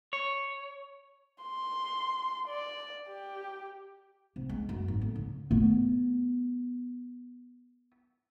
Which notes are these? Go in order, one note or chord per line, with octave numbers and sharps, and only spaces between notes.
C#5
C6
D5
G4
C3
G#3
F#2
G#1
A2
C#3
A3 B3